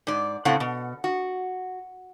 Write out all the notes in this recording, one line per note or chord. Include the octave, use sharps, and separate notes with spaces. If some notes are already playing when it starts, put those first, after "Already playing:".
G#2 D5
A2 C#3 A3 C4 F#5
B2
F#4